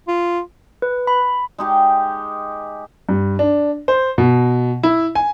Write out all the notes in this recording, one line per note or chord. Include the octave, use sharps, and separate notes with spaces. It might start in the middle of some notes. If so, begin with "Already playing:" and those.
F4
B4
B5
G#3 D#4 G4
G2
D4
C5
B2
E4
G#5